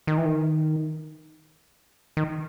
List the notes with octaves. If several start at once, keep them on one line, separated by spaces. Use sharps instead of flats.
D#3
E3
D#3
D#3